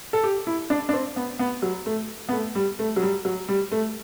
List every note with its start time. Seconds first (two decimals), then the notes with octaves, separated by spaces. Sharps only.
0.13 A4
0.24 G4
0.47 E4
0.70 D4
0.89 D4
0.93 C4
1.16 B3
1.39 B3
1.62 F#3
1.86 A3
2.29 B3
2.32 A3
2.55 G3
2.79 A3
2.96 F#3
3.02 G3
3.25 F#3
3.48 G3
3.72 A3